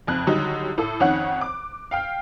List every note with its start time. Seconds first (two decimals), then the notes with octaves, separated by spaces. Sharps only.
0.07 F#1 F2 F#6
0.27 D3 D#3 F#3 G3 D#4
0.78 A2 A4
1.00 F2 D#3 C#4 F#5 F#6
1.41 D6
1.91 F5 G5 F6